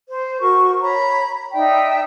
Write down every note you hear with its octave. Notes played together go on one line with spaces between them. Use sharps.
C5
F#4 A#4 C#6
C#5 A#5 B5
D#4 D5 E5 G5